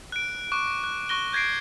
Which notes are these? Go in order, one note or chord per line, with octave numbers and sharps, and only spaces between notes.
F#6 D7
C#6 D6 F#6
F#6
C#6 F#6 A#6 G7
G6 G#6 A#6 C7 D7